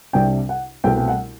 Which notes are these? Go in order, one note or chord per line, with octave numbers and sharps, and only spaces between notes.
C2 C3 G3 D4 G5
F#5
C2 B2 A3 C4 G5
G5
F#5